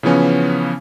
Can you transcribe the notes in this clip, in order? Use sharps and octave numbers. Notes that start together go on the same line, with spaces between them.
C#3 E3 F3 B3 C#4